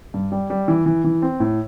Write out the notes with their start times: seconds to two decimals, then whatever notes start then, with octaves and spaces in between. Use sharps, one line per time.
0.14 G2
0.32 G3
0.50 G3
0.68 E3
0.86 E3
1.04 E3
1.22 C4
1.40 A2